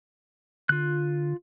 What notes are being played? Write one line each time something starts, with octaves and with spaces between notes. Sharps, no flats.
D3 F4 F#6